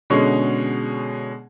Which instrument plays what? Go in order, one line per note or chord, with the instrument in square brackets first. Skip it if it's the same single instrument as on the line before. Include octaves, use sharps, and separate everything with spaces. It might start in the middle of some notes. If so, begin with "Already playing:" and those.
[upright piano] B2 D3 G#3 C#4 G#4 C#6